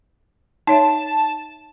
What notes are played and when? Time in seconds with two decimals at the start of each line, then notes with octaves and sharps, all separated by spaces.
0.67 D#4 C#5 E5 A5